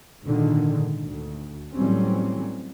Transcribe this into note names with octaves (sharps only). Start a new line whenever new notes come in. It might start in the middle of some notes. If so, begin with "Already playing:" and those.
G#1 A#2 D3 D#3 G#3
D2
A2 E3 F#3 G3 C4 C#4